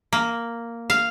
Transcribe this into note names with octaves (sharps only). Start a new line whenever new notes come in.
A#3
F5